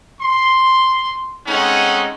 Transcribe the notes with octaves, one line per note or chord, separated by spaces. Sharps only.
C6
G#3 A3 C4 C#4 D#4 F#5